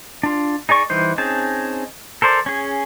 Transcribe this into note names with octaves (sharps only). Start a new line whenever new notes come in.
D4 F4
D#4 G#4 D5 C#6
E3 G3 D#4 C5
C4 C#4 D#4 G#4 A5
A4 A#4 C5 D5
C#4 G#4